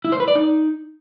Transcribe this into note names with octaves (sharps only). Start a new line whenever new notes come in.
E4
C5
B4
D5
D#4